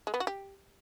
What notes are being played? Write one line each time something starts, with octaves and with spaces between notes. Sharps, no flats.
G#3
B3
F#4
G4